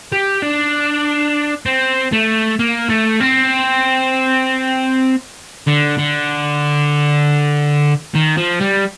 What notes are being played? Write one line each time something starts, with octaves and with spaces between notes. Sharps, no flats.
G4
D4
C4
A3
A#3
A3
C4
D3
D3
D#3
F3
G3